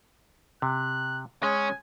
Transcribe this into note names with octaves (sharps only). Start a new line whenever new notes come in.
C3 F#6
G#3 C#4 G#5